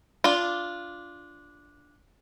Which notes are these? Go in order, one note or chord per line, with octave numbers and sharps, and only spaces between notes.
D4 F4